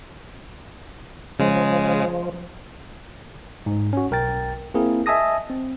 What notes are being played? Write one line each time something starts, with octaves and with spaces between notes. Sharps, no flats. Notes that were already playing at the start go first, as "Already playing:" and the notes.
C#3 F3 G#3
G#2
C#4 F#4
B1 A#4 G5 A6
A#3 C4 E4 G#4 A#4
D#5 E5 G#5 A5 D#6 A#6
C4